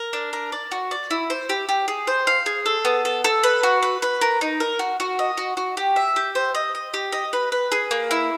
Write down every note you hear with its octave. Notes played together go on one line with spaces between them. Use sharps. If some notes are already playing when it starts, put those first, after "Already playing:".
Already playing: A#4
D4
A#4
D5
F#4
D5
E4
C5
G4
G4
G#4
C5
F5
G#4
A4
B3
A4
A4
B4
F#4
B4
B4
A#4
D#4
A#4
F#4
F#4
D#5
F#4
F#4
G4
E5
G4
C5
D#5
D#5
G4
D#5
B4
B4
G#4
A#3
E4